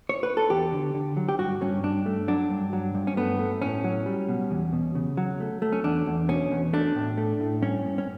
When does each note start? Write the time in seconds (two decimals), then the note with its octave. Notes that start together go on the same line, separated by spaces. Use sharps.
0.09 C#5
0.23 B4
0.37 A4
0.50 E2 G4
0.72 D3
0.94 D3
1.17 F#3
1.29 G4
1.39 G2 F#4
1.61 G2 C#4
1.83 G2 D4
2.06 A3
2.28 F#3 D4
2.50 G2
2.73 F#3
2.95 G2
3.07 C#4
3.17 A3 B3
3.39 A3
3.62 A2 C#4
3.84 F#3
4.06 G3
4.28 B2
4.51 E2
4.73 B2
4.95 C#3
5.17 F#3
5.40 A3
5.62 A3
5.72 C#4
5.84 E2 D4
6.06 E2
6.29 B2 C#4
6.51 E2
6.73 A3 D4
6.95 A2
7.18 A3
7.40 A2
7.62 G2 C#4
7.85 G2
7.98 C#4